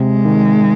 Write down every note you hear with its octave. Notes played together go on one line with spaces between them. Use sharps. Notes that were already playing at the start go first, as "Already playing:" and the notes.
Already playing: C3 G#3
D#3